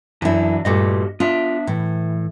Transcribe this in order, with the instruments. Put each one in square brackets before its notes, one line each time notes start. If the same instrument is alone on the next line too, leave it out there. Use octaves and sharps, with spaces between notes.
[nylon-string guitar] F#2 E4 [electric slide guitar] E3 F#3 D4
[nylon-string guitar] G2 A#2 A3 [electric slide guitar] F#4 G4 D#5
[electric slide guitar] B3 D4 E5 [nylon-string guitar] F4
[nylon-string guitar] A2 [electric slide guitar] E3